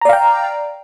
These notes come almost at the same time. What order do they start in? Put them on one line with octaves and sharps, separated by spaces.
A#5 D5 F5 G5